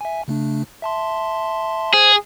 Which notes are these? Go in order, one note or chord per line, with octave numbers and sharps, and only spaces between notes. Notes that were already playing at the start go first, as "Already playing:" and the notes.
E5 G#5
C#3 A3 D4
E5 A5 C6
G#4 C5 G#6